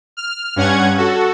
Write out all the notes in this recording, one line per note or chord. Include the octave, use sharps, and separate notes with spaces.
F6
G2 C#4 F#5 G#6
F#4 A4